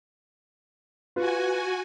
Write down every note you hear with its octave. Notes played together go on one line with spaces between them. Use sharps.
F4 F#4 B4 G#5